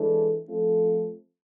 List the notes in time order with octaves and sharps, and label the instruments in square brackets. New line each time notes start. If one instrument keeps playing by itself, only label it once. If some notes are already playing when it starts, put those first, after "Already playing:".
Already playing: [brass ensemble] E3 G#3 D4 A4
F3 A3 C4 F4 A4